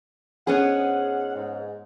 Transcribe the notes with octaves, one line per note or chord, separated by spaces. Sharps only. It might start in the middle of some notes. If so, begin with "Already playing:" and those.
G#2 B3 C#4 G#4 F#5
G#2